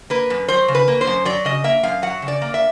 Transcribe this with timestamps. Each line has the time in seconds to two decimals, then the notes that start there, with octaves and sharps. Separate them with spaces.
0.10 A#3 B4
0.30 F#2
0.48 F#3 C5
0.68 C#3
0.75 B4
0.88 A#3
1.01 C5
1.07 F#2
1.25 F#3 D5
1.45 C#3 D#5
1.64 A#3 E5
1.83 F#2 F5
2.02 F#3 F#5
2.22 C#3
2.28 D5
2.42 A#3
2.54 E5